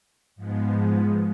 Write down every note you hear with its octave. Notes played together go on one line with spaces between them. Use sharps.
G#2 F3 G#3 B3